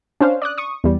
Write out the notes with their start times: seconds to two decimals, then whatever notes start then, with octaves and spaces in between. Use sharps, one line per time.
0.20 C#4 D4 C5 F5
0.42 D5 D#6 F#6
0.58 C#6 D#6
0.84 E2 G3